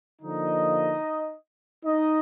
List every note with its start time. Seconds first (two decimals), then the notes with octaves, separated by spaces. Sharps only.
0.22 D3 F3 A#3 D#4 D#5
1.85 D#4 D#5